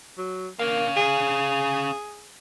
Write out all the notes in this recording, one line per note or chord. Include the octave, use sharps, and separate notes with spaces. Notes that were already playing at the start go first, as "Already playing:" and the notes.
F#3
A#3 C#4 F5
G#4